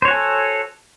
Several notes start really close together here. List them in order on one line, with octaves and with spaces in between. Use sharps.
C5 C#5 F#4 G#5 A4